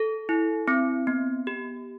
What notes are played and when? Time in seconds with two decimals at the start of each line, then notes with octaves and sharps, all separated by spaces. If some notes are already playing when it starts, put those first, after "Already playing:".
Already playing: A4
0.29 E4
0.68 C4
1.07 B3
1.47 G4